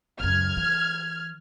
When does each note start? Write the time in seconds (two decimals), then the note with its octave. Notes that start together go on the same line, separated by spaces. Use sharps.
0.20 C#2 F#2 F6 G#6
0.57 E3